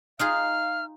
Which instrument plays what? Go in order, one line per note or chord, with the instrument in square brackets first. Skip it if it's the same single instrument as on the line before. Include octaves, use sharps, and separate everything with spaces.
[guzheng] D#4 F4 G#4 [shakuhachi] F5 [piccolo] F6